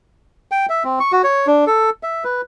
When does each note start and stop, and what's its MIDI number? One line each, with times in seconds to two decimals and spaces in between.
0.51 0.66 79
0.69 0.83 76
0.85 0.99 60
1.00 1.12 85
1.12 1.22 66
1.24 1.47 73
1.47 1.65 62
1.67 1.90 69
2.03 2.24 76
2.24 2.41 71